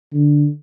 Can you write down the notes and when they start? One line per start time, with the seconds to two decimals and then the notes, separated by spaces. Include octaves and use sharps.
0.13 D3